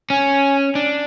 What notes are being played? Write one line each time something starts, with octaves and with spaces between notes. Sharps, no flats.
C#4 G#5
D4